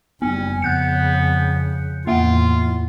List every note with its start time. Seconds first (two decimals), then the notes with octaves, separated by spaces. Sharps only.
0.22 F#1 G3 B3 C#4
0.62 F2 C#3 B3 F#6 G6 C#7
2.07 E2 A2 A#3 F4 E5 F#5